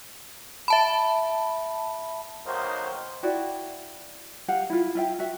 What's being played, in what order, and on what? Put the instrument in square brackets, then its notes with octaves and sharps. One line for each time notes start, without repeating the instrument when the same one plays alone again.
[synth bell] E5 A5 B5
[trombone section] B1 D#3 F#3 A#3 D#4 C5
[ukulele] E4 F#4 D5 G5
G4 F5 F#5
E4 F4
F4 E5 G5
F#4 E5